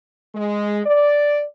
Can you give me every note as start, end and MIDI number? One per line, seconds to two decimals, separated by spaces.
0.35 0.81 56
0.86 1.43 74